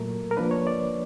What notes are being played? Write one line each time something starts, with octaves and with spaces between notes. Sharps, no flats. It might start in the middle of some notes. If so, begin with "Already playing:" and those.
Already playing: A#2 F#3 A3 A#4
A#4
F3 A#3 D4 B4
C#5
D5